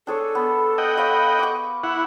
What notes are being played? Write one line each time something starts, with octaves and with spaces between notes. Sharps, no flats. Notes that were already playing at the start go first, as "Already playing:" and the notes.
D4 G#4 A4 C#5
B3
D#5 F#5 G5
C#5 F5 B5
C#6 D6
E4 F#5